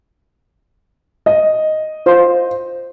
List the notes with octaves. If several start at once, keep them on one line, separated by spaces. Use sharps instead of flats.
D#5
F4 C5